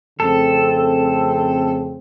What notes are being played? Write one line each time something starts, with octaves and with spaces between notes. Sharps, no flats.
F2 C#3 A3 C4 A4